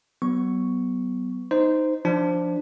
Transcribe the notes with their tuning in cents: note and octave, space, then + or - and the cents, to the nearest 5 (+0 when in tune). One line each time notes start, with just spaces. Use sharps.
F#3 +30 B3 +0 C#6 +0
D#4 +0 C5 -15
F3 +0 D4 +0